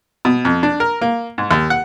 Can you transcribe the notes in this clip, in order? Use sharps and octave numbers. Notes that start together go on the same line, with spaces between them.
B2
F2
D4
A#4
A#3
G#2
D#2
F#5